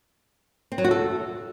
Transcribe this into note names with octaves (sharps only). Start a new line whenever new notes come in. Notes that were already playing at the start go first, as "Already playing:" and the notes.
C4
F#3
F#4
A4